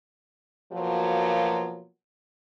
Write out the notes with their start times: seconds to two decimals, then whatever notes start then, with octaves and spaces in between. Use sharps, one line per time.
0.72 B2 F3 F#3 A#3